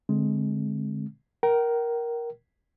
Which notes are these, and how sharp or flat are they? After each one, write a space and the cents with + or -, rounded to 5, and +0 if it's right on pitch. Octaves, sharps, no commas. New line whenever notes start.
D3 +0 G#3 +10 C4 +0
A#4 +10 G5 -40